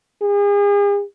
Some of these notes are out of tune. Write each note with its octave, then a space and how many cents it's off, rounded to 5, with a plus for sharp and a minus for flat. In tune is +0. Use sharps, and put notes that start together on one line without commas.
G#4 -40